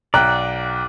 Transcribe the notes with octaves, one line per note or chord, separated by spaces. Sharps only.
B1 D5 F#5 G5 A#5 F#6